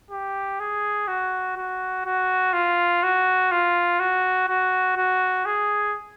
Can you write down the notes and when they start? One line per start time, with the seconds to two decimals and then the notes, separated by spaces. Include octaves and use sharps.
0.11 G4
0.60 G#4
1.08 F#4
1.57 F#4
2.05 F#4
2.53 F4
3.03 F#4
3.51 F4
4.00 F#4
4.48 F#4
4.97 F#4
5.46 G#4